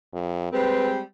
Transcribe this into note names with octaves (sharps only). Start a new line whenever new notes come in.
F2
G3 G#3 C4 B4